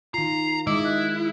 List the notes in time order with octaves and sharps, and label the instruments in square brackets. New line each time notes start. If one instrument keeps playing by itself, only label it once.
[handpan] D#3 F4 [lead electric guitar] A#5 [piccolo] C7
[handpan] D#3 G#3 D#5 [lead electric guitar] E4 [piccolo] D6
[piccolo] F#6